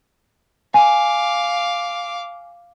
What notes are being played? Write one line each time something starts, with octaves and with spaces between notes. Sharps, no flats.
F5 G#5 D6